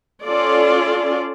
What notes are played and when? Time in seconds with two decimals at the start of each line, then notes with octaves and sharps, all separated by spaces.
0.24 C#4 F4 A4 D5